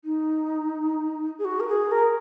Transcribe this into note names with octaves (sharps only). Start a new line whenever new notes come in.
D#4
G#4
F#4
A#4
G#4
A#4